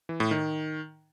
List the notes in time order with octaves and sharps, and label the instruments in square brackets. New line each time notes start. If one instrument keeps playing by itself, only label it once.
[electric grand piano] E3
A2
D#3